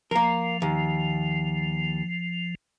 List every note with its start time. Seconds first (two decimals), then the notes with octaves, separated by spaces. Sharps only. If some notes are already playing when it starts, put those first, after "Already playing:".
0.11 F3 A#3 A#4
0.62 D#2